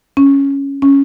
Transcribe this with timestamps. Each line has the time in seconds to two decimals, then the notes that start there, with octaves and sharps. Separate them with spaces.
0.17 C#4
0.82 C#4